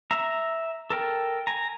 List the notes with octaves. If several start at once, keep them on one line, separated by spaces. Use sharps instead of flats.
E5 A#5
A4 A#4 G5
G#5 A#5